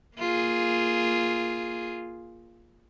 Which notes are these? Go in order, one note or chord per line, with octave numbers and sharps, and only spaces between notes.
A#3 F4 G#4